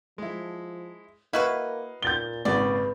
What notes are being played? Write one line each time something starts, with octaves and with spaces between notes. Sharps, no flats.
F3 G#3 E4
A#3 E4 F#4 B4 D#5 F5 F#5
A#2 G6 A6 G7
G#1 A#2 C#3 B4 D5